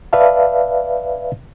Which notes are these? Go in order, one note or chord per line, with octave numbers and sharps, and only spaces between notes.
B4 D5 E5 F5 A5